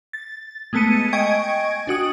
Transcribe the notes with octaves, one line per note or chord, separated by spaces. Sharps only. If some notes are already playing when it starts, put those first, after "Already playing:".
A6
G#3 A3 B3 A5 C#7 D#7
D#5 G5 G#5 C#6 G#6 D7
D4 F#4 D#6